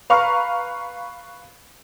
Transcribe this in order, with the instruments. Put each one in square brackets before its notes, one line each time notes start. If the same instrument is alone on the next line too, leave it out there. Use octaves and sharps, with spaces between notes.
[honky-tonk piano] B4 F5 A#5 B5 C#6 F6